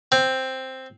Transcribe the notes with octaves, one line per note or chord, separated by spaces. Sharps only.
C4